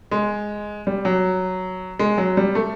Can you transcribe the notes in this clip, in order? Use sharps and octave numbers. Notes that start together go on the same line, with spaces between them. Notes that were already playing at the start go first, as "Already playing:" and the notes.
G#3
G3
F#3
G#3
F#3
G3
A3